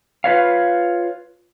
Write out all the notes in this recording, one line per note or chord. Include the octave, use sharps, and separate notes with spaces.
F4 B4 C#5 F5